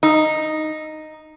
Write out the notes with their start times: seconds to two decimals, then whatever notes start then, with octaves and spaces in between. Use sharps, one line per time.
0.03 D#4